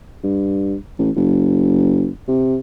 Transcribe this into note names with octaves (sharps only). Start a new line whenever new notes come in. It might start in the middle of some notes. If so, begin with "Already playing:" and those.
G2
A1
F#1
C3